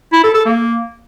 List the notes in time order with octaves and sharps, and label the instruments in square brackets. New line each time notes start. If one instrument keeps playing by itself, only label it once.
[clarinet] E4
A4
A4
A#3